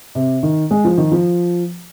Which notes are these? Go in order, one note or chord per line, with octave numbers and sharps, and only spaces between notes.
C3
D#3
G#3
F3
D#3
F3